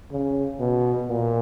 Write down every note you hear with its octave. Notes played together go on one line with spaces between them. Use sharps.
C#3
B2
A#2